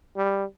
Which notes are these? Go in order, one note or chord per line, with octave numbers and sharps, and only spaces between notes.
G3